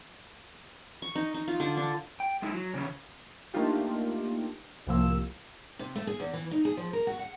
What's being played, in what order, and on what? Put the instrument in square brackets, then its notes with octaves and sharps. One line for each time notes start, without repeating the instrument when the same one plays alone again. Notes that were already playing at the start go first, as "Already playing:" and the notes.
[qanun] C#6
D#4
D#4
F4
D3
D4
[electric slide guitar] G5
G#3 D#4 E4
F#3
E2 C#3 C#4 C#5
[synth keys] A3 A#3 D4 D#4 F4 G4
C2 A2 C3 F3 A#3 E6
[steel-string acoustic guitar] C3
A3
G#4
E2
E3
D#4
G#4
F3
A#4
F#4
F#5